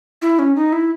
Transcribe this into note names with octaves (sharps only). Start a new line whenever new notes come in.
E4
C#4
D#4
E4